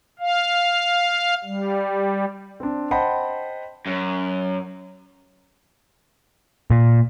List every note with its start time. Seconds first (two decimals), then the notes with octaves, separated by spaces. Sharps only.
0.19 F5
1.44 G3
2.60 C4 D4
2.91 C5 D#5 F#5 G5 A5 B5
3.86 F#2
6.70 A#2